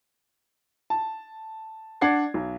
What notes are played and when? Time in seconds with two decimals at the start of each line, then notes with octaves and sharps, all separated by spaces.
0.90 A5
2.01 D4 D5 F#5 G#6 C7
2.34 B1